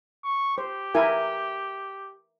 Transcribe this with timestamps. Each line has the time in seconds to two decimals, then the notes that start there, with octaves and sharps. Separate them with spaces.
0.24 C#6
0.58 G4 C5
0.94 E4 A#4 G#5